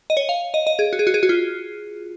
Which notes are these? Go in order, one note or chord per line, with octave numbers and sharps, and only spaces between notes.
D#5
C#5
F5
D#5
D#5
G#4
F#4
G#4
F#4
G#4
F#4
F4